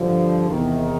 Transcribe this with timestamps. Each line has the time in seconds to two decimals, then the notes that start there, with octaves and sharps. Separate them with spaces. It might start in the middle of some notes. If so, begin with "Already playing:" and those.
Already playing: G2 D3 F3
0.49 E2 C3 D#3